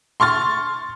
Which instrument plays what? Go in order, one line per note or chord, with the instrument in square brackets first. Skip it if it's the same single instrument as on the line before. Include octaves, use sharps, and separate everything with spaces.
[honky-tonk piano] C6 C#6 F6 A6